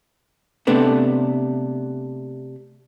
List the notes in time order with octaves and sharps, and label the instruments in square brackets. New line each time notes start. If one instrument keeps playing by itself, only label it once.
[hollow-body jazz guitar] C3 A3 B3 D4